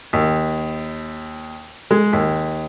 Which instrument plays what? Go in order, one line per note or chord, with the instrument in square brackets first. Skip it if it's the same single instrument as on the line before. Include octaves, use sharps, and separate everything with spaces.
[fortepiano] D#2
G#3
D#2